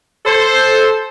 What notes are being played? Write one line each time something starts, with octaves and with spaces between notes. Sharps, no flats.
A4 C5